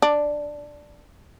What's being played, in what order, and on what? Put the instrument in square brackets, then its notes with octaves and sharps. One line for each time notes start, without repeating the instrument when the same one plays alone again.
[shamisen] D4